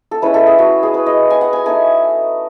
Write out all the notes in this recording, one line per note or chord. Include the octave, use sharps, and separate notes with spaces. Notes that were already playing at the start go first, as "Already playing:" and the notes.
A4
G#3 C#4 E4 B4
A4
G#4
F#4
G#4
B4
D#5
G#5
F#5
G#5
A3 D#4 G#5